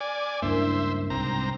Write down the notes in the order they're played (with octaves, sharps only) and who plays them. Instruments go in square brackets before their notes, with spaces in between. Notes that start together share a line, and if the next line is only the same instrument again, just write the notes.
[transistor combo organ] D5 G#5
[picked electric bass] C#2 G2 A#3 [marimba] D4 E4 A#4 [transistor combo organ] C5 E5
[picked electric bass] C2 G#2 [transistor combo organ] C4 A#5